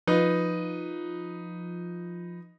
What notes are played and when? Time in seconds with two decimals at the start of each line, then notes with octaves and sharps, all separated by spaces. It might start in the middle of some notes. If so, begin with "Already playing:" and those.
0.07 F3 D#4 F4 B4